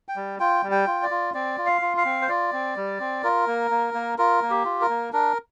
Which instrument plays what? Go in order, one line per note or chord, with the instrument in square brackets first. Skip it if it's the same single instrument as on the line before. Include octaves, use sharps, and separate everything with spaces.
[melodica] G5
G3
F4 G5
G3
G5
F4
D5
F4
C4 D5
F4
F5
F4
F5
C4
C5
F4 D5
C4
G3
C4
F4 A#4
A#3
A#3
A#3
F4 A#4
A#3
G4
F4
A#4
A#3
D4 A#4